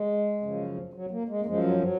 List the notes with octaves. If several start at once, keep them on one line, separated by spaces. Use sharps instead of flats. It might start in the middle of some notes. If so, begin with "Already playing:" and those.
Already playing: G#3
F#2 C#3 F3
F#3
A#3
G#3
A#3
F#2 F3 G#3
F#3
F#3